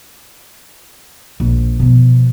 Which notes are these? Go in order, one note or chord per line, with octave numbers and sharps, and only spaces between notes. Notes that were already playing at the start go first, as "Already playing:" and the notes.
A#1
B2 F3